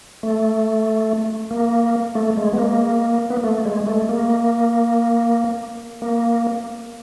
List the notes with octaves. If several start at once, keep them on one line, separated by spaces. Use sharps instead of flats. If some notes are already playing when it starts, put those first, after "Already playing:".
A3
A#3
A3
G#3
B3
A#3
B3
A#3
A3
G#3
A3
A#3
A#3